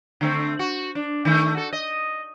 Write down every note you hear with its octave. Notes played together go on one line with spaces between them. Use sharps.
D3 A3 C4
F#4
D4
D#3 A3
F#4 A4
D#5